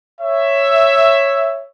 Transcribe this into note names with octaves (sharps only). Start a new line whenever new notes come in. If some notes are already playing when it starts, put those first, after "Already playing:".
C#5 E5